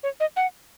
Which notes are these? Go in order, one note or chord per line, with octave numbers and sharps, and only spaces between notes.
C#5
D#5
F#5